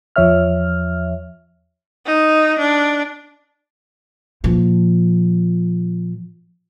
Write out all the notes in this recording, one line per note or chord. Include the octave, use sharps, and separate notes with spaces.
E2 F3 C#5 E5 F6
D#4
D4
A#2 F3